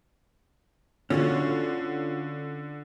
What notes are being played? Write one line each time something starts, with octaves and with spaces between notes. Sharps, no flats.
D3 C#4 F4 F#4